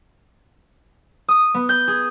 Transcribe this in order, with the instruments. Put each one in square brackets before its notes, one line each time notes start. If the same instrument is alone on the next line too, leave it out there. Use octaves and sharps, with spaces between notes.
[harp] D#6
B3
G6
G#4